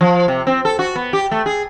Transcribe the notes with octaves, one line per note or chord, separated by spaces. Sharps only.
F3
C3
C4
A4
F#4
B3
G4
A3
G#4